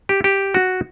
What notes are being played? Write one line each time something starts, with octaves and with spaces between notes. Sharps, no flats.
G4
G4
F#4